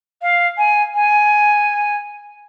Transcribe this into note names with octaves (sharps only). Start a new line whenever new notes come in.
F5
G#5
G#5